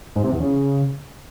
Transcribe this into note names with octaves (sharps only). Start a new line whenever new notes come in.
G#2
C3
E2
C#3